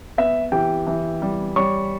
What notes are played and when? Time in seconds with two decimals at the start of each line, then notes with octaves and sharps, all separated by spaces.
0.18 B3 E5
0.52 E3 G4 G5
0.87 E3
1.22 G3
1.56 G3 C#5 C#6